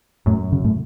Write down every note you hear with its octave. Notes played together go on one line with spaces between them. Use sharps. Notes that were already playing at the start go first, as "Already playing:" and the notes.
F#2 A2
C#3
A2